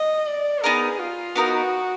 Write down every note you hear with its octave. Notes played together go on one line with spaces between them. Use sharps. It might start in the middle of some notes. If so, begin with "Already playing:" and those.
Already playing: D#5
D5
B3 D#4 G#4 A#4
F4
B3 D#4 F#4 A#4